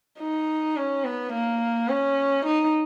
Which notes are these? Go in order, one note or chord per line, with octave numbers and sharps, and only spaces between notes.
D#4
C#4
B3
A#3
C#4
D#4